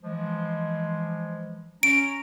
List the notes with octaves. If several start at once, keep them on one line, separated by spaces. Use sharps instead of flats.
E3 F3 G#3
C#4 A#5 D7